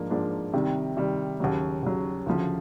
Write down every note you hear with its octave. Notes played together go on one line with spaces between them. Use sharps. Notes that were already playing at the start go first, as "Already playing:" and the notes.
Already playing: G#2 F3 A#3 D4
G#2 F3 A#3 D4
C3 D#3 G3
C3 D#3 G3
D#2 C#3 F#3
D#2 C#3 F#3
D2 C#3 F3